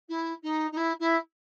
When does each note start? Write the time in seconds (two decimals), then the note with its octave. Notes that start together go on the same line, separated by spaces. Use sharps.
0.08 E4
0.43 D#4
0.71 D#4
0.76 E4
0.99 E4